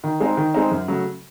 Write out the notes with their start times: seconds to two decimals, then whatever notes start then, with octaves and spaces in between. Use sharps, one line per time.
0.04 D#3
0.20 G#3 C4 D#4
0.37 D#3
0.54 G#3 C4 D#4
0.71 F#2
0.88 C#3 F#3 A3